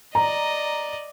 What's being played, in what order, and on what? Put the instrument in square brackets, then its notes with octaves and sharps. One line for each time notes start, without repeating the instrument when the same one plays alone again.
[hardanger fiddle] D5 D#5 [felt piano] A#5